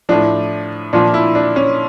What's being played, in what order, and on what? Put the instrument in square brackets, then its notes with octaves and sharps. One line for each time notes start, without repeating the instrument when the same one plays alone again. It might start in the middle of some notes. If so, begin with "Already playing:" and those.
[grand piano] A2 F3 D4
A#2 F3 D4
E4
D4
C#4